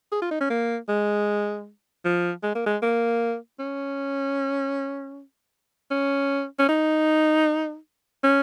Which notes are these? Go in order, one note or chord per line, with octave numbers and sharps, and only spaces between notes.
G#4
F4
D#4
C#4
A#3
G#3
F3
G#3
A#3
G#3
A#3
C#4
C#4
C#4
D#4
C#4